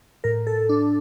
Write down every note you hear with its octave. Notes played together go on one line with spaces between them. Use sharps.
A2 A#4
A4
D4